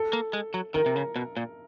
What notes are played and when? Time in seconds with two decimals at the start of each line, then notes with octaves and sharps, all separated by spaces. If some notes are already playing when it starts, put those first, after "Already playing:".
Already playing: A4
0.13 A#3
0.33 G#3
0.54 F#3
0.74 D#3 A#4
0.86 C3
0.96 C#3
1.16 B2
1.37 A#2